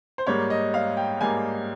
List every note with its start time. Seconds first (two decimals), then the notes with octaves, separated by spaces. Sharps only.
0.18 C5
0.27 G#2 G3 A#3 C#5
0.50 D#5
0.74 F5
0.97 G5
1.21 G#2 G3 A#3 G#5